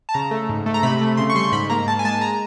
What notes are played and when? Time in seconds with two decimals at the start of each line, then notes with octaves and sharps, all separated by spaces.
0.09 A5
0.14 C#3 A#5
0.31 A3
0.49 G#2
0.66 A3
0.74 A#5
0.83 C3 B5
1.01 A3
1.17 C#3 C6
1.30 C#6
1.35 G3 C6
1.52 G#2 B5
1.70 A#3 A#5
1.86 G#2 A5
1.99 G#5
2.05 G#3 A5
2.21 A#5